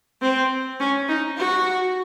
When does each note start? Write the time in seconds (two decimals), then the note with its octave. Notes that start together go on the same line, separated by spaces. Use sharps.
0.22 C4
0.80 C#4
1.09 D#4
1.38 F#4